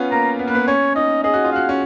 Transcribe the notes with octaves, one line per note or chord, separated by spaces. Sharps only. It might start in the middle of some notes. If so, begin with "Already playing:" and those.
Already playing: B3 C#4 F4
A#3 A#5
B3
A#3 B4
B3
C#4 C#5
D#4 D#5
G#4 D#5
F#4
F4
F#4 F5
C#4